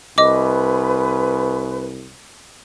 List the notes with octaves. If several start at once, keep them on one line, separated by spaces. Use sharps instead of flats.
C2 B4 D#5 D6